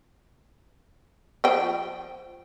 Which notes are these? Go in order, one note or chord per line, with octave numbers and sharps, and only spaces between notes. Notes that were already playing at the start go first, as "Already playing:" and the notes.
F3 G5